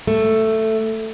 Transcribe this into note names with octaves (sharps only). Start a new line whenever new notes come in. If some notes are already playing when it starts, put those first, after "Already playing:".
A3